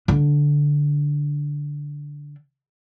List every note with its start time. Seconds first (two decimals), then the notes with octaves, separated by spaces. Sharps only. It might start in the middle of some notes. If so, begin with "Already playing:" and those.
0.08 D3 D4